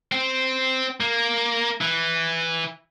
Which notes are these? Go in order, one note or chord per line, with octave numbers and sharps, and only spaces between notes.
C4
A#3
E3